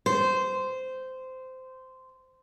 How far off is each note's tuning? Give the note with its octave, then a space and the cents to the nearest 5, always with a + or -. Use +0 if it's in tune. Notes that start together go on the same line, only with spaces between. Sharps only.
C5 -15